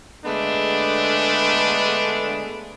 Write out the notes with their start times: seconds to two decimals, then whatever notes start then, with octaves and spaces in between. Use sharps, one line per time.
0.25 D3 G#3 A3 B3 D4